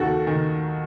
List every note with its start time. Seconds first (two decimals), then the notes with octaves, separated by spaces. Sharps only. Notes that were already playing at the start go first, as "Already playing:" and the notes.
Already playing: D#2 D#3 F#4 A4
0.27 D#3